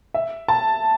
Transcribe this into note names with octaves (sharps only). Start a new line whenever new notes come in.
E5
A5